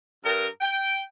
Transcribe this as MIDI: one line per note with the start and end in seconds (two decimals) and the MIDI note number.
0.24 0.46 43
0.24 0.46 70
0.61 1.01 79